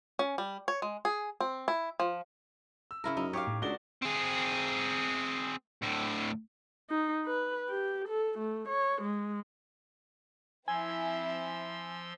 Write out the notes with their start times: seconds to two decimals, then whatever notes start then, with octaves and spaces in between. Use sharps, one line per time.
0.19 C#4
0.38 G3
0.68 C#5
0.82 G#3
1.05 G#4
1.40 C4
1.68 E4
2.00 F3
2.91 E6
3.04 C#3 E4 A#4
3.17 F#2 D#4
3.33 G4 C#5 F5 D6
3.47 A2
3.62 C#2 D4 F#4 G#4 A#4 D5 G7
4.02 C4 G#4
5.82 D2 A2
6.90 D#4
7.26 B4
7.69 G4
8.08 A4
8.38 A3
8.69 C#5
9.02 G#3
10.68 F3 C4 E4 E5 G#5 C6 E6